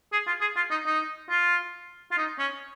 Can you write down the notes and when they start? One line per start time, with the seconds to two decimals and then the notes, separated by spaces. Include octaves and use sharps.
0.12 G#4
0.27 F4
0.41 G#4
0.56 F4
0.71 D#4
0.86 D#4
1.29 F4
2.11 F4
2.18 D#4
2.39 C#4